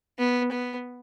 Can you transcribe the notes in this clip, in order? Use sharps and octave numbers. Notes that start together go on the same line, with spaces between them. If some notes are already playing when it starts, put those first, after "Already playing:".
B3
B3